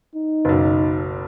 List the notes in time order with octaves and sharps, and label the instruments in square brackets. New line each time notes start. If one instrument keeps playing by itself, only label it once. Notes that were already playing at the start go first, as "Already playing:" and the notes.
[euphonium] D#4
[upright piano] F#1 B1